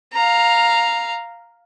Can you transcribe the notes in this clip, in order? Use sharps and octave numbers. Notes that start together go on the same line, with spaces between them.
F5 A#5